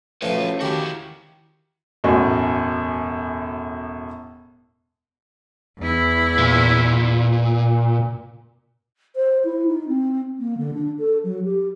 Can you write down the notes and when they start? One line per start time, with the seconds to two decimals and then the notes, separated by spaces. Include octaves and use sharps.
0.22 F#2 A2 F3 A3 C#4 B4 C#5
0.61 D#3 E4 F#4 G4
2.04 E1 F#2 A2 F#4
5.79 E2 E4
6.38 A#2
9.16 C5
9.45 E4
9.67 D#4
9.88 C4
10.39 A#3
10.58 D3
10.74 D4
11.00 A4
11.24 F#3
11.45 G4